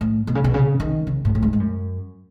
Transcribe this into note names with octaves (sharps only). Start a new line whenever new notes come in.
A2
B2
C#3
B2
C#3
D#3
C#3
A2
A2
G#2
G#2
F#2